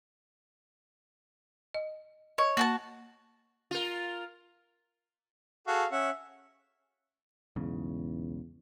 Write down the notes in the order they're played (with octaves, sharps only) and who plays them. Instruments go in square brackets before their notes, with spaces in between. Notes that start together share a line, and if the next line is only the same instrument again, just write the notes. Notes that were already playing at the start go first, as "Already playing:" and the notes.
[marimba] D#5
[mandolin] C#5 [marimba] D#5
[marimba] A#3 [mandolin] F#4 G5 A5
[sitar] F4 A#4
[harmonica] F#4 G#4 A4 [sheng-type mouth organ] F5
[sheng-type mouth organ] C#4 F#5 [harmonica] E5
[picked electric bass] B1 G#2 C#3 [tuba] E2